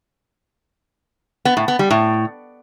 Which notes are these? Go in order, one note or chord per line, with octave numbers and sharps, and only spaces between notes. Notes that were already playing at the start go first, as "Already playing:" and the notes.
B3
A2
B3
G3
A2